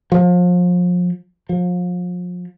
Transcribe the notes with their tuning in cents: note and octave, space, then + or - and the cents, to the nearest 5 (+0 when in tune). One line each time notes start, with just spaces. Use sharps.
F3 +35
F3 +35